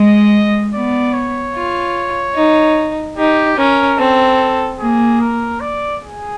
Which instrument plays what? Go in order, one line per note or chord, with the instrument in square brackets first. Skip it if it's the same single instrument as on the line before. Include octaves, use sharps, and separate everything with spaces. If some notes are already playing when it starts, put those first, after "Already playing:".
Already playing: [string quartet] G#3 [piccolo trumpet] D#5
[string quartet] B3 [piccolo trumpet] D5
[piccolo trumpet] C#5
[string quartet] F4
D#4
[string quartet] D#4 [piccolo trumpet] G4
[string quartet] C#4 [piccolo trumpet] A#4
[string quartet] C4 [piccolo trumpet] A4
[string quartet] A#3 [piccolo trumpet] G#4
[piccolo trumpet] A#4
D5
G#4